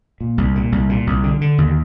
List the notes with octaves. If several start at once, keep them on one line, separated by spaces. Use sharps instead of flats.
A#2
C2
A#2
C2
A#2
C2
D3
D3
D#2